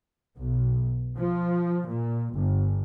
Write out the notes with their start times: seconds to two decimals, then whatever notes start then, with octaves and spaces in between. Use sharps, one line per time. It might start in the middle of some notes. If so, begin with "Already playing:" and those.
0.37 B1
1.17 F3
1.86 A#2
2.33 G1